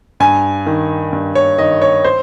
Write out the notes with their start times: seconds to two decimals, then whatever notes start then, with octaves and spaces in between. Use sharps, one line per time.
0.20 G2 G#5
0.67 D#3
1.13 G2
1.35 C#5
1.58 D#3 D#5
1.82 C#5
2.04 C5